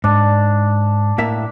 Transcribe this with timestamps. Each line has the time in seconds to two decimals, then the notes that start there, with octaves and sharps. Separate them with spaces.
0.04 G#2 D4
1.18 A2 A#3 E5